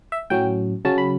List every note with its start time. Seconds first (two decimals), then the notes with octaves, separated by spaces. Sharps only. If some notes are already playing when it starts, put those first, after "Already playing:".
0.12 E5
0.30 A2 F#3 C#4 G5
0.85 C#3 F#3 C#4 A5
0.98 B5